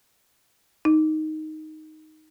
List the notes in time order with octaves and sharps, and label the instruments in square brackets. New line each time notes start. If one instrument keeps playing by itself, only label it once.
[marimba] D#4